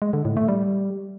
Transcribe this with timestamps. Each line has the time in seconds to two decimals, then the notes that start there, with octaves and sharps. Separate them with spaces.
0.02 G#3
0.13 D3
0.25 A2
0.37 A3
0.48 G3